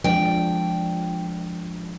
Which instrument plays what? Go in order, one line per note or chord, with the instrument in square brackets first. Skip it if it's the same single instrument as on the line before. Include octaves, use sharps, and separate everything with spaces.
[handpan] F3 G#3 D4 [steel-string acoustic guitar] G5